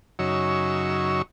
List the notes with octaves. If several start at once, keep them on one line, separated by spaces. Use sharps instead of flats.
F#2 C#3 F#3 D#4 C#6 E6